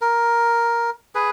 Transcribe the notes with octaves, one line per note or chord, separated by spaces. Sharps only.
A#4
G#4 B4